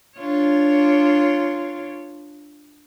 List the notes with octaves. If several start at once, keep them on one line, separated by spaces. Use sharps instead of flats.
D4 F4 C#5